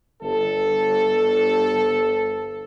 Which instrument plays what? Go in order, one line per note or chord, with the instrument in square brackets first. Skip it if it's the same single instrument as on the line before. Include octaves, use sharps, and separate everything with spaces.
[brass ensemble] G1 A4